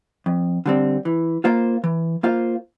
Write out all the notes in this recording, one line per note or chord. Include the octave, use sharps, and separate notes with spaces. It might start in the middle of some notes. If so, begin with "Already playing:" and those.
F2
D3 G3 C4
E3
A#3 F4 C5 F5
E3
A#3 F4 C5 F5